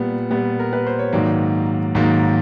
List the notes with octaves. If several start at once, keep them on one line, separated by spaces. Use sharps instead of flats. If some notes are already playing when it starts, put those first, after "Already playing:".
Already playing: A#2 G3 B3
A#2 G3 B3
A#4
B4
C5
C#5
G#2 D#3 F#3 A#3 D5
G#2 D#3 F#3 A#3